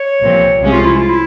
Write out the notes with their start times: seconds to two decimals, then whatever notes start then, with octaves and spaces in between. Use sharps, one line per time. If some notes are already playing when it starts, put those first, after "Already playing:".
Already playing: C#5
0.21 C2 A#2 F3 C4
0.60 C2 C3 F3 G#3 C#4
0.72 F4
0.86 E4
0.97 F4
1.10 E4